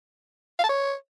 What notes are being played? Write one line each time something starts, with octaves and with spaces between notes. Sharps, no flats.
F5
A5
C#5